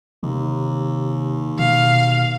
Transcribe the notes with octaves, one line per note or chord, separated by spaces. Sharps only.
D#2 C3
B2 F5